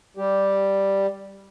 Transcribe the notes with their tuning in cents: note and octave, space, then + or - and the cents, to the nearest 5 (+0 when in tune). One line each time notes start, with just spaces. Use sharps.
G3 +0 G4 +0